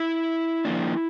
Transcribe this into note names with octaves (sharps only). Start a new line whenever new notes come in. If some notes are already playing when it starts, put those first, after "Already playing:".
Already playing: E4
F3 A#3 D4